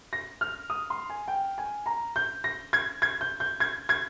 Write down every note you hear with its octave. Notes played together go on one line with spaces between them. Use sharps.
A#6
F6
D#6
C6
G#5
G5
G#5
A#5
G6
A#6
G#6
G#6
G6
G6
G#6
G#6